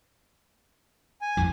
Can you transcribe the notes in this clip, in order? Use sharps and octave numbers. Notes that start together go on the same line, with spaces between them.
G#5
A1 F2 E3